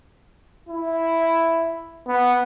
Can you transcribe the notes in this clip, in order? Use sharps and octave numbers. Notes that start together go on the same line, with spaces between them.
E4
B3